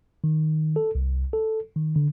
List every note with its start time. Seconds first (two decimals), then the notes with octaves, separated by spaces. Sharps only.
0.24 D#3
0.76 A4
0.95 C2
1.33 A4
1.76 D#3
1.96 D3